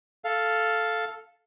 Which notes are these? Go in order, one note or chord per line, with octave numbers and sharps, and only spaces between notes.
A4 F5